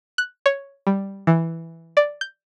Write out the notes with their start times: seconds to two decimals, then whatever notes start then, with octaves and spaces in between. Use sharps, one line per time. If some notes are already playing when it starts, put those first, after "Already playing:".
0.18 F#6
0.46 C#5
0.87 G3
1.27 E3
1.97 D5
2.21 G6